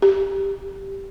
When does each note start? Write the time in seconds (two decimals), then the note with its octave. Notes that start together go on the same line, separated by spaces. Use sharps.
0.02 G4